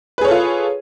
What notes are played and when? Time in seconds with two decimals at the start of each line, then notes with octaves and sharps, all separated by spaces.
0.18 B4
0.21 G#4
0.25 C#5
0.28 A4
0.31 F4